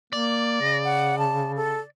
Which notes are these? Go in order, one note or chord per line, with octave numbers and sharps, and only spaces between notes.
A#3 D5
C#3 A#6
F#5
A5
A4